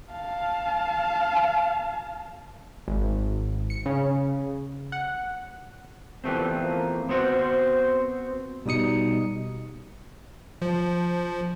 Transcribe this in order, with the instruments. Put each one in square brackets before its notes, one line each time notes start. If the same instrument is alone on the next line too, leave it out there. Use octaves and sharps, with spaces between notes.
[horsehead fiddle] F5 A5
[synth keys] G#1
C#7
C#3
F#5
[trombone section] A#2 A3 G4 [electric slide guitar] E3 B3 C4
[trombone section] F3 A3 A#3
[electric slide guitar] B3 C4 F#4 [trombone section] C5
[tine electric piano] B2 G3 D#4 D#6 C#7
[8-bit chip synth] F3